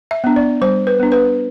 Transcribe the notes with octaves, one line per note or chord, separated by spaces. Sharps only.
E5
B3 D4
D5
G3 C5
B4
B3 D4
B4